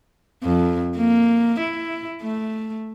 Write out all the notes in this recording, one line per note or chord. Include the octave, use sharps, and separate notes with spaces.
F2
A#3
E4
A3